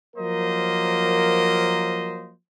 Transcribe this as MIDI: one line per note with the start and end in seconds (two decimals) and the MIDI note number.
0.17 2.31 53
0.17 2.31 54
0.17 2.31 58
0.17 2.31 70
0.17 2.31 72
0.17 2.31 75